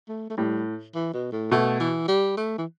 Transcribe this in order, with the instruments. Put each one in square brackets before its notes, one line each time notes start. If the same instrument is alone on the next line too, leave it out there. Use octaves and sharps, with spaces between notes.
[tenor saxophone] A3
A3
[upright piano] A2 [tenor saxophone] G3
[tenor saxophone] E3
B2
A2
[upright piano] B2 [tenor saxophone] A3
[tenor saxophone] E3
G3
A3
E3